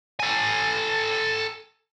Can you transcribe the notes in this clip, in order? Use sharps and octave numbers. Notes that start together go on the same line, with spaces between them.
A4 G#5